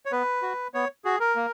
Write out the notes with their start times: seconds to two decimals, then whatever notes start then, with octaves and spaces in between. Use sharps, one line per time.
0.06 C#5
0.12 B3 B4
0.42 F#4
0.74 B3 C#5
1.04 F#4 G#4
1.20 A#4
1.36 A#3